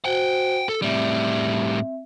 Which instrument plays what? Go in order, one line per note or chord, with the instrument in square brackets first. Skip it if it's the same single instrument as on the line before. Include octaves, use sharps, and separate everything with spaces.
[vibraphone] F#4 C5 [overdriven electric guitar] F#5 G5
[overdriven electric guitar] A4
[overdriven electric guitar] A2 G3 [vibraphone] C4 E5